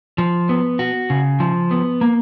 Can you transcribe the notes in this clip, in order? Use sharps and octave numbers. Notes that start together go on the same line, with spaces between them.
F3
B3
F#4
C#3
F3
B3
A#3